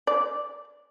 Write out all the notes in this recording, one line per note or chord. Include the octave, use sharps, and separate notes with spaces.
D5